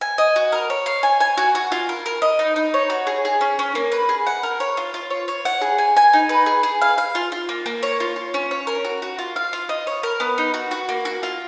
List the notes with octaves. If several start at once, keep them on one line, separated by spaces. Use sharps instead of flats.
G#5
D#5
F#4
A#4
C#5
F5
G#5
G#5
F#4
F#4
F4
A#4
A#4
D#5
D#4
D#4
C#5
F#4
G#4
G#4
C#4
C#4
A#3
B4
G#4
F#5
A#4
C#5
F4
F4
C#5
C#5
F#5
G#4
G#5
G#5
D#4
B4
G#4
G#4
F5
F5
F4
F4
A#3
A#3
C#5
F4
F4
C#4
C#5
A#4
F#4
F#4
F4
F5
F4
D#5
C#5
A#4
B3
D#4
F#4
F#4
A#3
F#4
F4